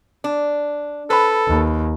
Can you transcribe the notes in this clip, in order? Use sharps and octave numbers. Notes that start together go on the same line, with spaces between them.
D4
A4 B4 C5 B5
D#2